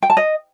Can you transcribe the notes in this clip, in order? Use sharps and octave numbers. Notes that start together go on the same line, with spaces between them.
G5
A5
D#5